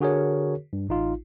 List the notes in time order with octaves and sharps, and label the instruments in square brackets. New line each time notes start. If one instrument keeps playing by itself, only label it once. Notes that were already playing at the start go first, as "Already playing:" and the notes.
[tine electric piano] D3 F#4 G#4 A#4 C#5
G2
A1 D#4 F4